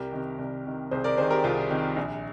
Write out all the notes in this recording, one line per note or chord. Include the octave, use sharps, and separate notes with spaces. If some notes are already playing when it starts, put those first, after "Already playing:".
Already playing: C2 G4 A#4
C3 D#3
C2
C3 D#3
C2 G#4 C5
A#4 D5
C3 D#3 G#4 C5
G4 A#4
C2 F4 G#4
C3 D#3
A#1